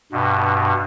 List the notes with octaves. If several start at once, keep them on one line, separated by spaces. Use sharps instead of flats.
G2 B2